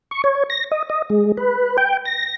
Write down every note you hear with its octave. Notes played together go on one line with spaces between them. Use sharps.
C#6
C#5
A#6
D#5
D#5
G#3
B4
G5
A#6